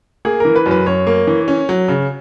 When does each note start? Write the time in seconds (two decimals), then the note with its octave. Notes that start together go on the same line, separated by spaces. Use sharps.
0.25 A#3 G#4
0.40 E3 A#4
0.56 B4
0.66 F#2
0.71 B4
0.86 F#2 C#5
1.07 A#3
1.27 E3
1.48 C#4
1.69 F#3
1.88 C#3